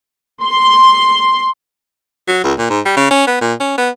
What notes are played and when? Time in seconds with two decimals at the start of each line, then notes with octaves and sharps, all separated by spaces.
0.44 C6
2.28 F#3
2.44 C#2
2.59 A#2
2.70 G#2
2.85 G3
2.97 C#3
3.11 C#4
3.27 B3
3.41 A#2
3.60 C#4
3.78 B3